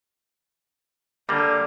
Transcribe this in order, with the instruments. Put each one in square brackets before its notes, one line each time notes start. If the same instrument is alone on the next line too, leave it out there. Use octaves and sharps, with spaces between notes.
[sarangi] D3 [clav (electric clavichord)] G3 A#3